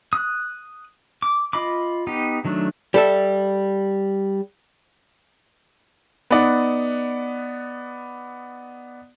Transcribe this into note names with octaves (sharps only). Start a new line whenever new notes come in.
D#6 F#6
D6
F4 D#5 B5 D6
B3 D#4 G4
D#3 F#3 A3 D4
G3 A4 E5
B3 D#4 D5 F#5